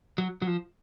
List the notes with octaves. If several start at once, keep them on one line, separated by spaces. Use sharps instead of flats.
F#3
F#3
F3